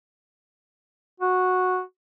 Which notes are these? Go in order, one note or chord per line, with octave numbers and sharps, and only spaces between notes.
F#4